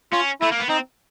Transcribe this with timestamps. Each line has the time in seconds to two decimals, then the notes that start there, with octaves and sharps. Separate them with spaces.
0.12 C#4 F4
0.41 A3 E4
0.51 A#3
0.60 B3
0.69 C4 D#4